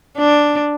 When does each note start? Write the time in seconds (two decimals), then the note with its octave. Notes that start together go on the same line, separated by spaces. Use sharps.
0.18 D4